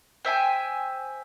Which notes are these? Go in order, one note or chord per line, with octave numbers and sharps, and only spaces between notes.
C5 E5 G5 G#5